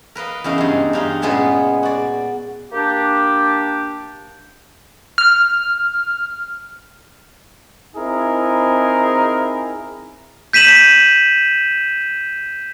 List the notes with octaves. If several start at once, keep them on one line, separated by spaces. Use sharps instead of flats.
A#4 B4 D#5 F5
E2 C#3 D#4 A#4 F5
G2 G#3
G2 G3 D#4 F5
A#2 C#3 G#3 B3 G#4 B4
F#4 D5
A#3 D4 G4
F6
C4 D#4 E4 G#4 A#4
G6 B6 D#7 E7 F#7